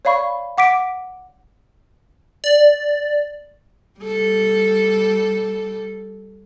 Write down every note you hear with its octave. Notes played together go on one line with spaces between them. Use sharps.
C#5 D5 F5 B5 C#6
F#5 D6 B6 D7
D5
G3 A4